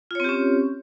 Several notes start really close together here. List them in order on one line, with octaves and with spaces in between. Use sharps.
F4 C#5 C4 G4 C#4